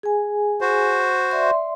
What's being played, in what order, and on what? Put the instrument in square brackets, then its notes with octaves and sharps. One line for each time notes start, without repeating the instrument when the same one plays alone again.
[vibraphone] G#4 G#5
[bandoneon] F#4 C5
[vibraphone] D5 E5 C6